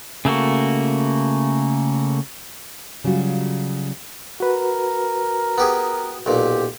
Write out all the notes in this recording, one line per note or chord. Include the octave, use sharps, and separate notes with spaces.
C#3 A3 A#3 F#4
C#3 F#3 G3 F4 F#4
F#4 A#4 B4
B3 G4 G#4
B1 A#2 G4